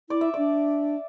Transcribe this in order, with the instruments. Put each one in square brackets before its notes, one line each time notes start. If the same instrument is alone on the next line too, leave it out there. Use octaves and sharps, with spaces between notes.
[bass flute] E4 [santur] D5
[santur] E5
[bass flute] D4 [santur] D5